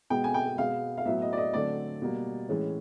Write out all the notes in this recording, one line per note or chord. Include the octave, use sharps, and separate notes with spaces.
B2 G#3 B3 G5
G#5
G5
B2 G#3 B3 F5
F5
A2 F#3 B3 E5
D#5
D5
D#5
D3 F#3 A3 C4 D5
B2 G3 A#3
A2 E3 G#3 C#4